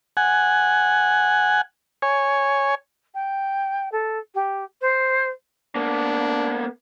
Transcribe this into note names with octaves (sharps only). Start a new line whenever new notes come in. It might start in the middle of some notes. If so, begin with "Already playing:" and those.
F#5 G#5
C#5 G#5
G5
A4
G4
C5
A#3 B3 D4